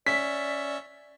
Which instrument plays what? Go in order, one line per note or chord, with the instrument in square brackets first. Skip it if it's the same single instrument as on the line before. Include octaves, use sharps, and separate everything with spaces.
[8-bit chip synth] C#4 E5 C#7 [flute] D5 [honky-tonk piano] B6